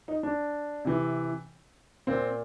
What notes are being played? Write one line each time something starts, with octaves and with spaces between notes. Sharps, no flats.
D#4
D4
C3 E3
A#2 C4